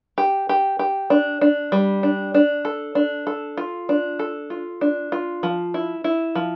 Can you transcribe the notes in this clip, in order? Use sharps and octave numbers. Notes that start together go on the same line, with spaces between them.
G4
G4
G4
D4
D4
G3
D4
D4
A4
D4
A4
F4
D4
A4
F4
D4
F4
F3
E4
E4
F3